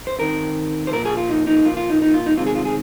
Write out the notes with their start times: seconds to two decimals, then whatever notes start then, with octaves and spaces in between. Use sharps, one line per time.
0.07 C5
0.19 D#3 C4 A#4
0.87 C5
0.93 A#2 F3 A#3 A#4
1.05 G#4
1.17 F4
1.29 D#4
1.47 D#4
1.65 A#2 F3 A#3 F4
1.77 F4
1.90 D#4
2.02 D#4
2.14 F4
2.26 D#4
2.37 C3 D#3 G#3 C4 F4
2.47 G#4
2.55 F4
2.65 G#4